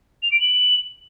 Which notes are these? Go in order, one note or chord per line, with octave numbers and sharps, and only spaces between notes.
F7
D7
F#7